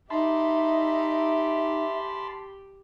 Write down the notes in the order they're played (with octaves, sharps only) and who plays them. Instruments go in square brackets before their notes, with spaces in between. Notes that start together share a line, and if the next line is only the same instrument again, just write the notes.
[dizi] D#4 [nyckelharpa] G4 [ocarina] E5 [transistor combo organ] A5 B5 C6